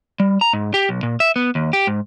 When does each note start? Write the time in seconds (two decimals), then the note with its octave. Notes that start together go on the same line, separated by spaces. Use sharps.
0.20 G3
0.41 A#5
0.53 G#2
0.74 G4
0.89 B1
1.03 A#2
1.20 E5
1.36 B3
1.55 D#2
1.73 G4
1.87 G#2